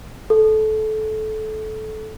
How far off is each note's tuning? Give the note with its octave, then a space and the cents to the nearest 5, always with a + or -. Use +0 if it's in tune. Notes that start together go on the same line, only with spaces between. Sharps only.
A4 -20